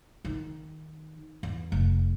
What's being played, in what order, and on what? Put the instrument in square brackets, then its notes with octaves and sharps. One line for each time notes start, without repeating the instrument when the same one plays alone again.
[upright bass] D#3
E2
F1